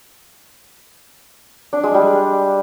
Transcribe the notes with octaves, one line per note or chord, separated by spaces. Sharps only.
D4
G#3
G3